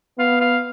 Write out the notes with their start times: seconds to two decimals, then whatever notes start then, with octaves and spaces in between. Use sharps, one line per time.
0.19 B3 F5
0.41 F5